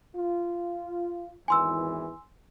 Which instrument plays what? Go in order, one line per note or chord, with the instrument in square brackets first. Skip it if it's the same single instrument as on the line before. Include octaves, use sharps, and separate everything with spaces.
[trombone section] F4
[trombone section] G#1 E2 E3 [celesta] G#5 C6 E6